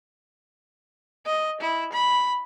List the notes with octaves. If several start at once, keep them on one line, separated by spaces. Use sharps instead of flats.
D#5
E4
B5